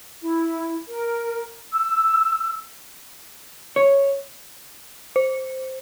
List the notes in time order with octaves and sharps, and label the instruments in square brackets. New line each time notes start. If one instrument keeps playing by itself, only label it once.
[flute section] E4
A#4
E6
[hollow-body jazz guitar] C#5
[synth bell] C5